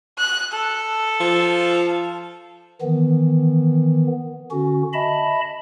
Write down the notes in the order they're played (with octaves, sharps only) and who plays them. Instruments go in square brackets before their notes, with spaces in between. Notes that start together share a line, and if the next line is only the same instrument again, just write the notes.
[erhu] F#6
A4
[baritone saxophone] F3
[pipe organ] D#3 E3 B3
D3 C#4 F#4
D#5 E5 A5 B5